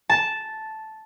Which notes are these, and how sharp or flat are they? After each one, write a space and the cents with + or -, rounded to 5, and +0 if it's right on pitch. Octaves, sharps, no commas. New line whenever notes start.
A5 -5